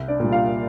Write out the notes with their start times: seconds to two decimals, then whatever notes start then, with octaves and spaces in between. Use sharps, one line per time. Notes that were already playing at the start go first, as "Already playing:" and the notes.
Already playing: C2
0.08 D4 D5
0.20 A#2 G3
0.31 F4 F5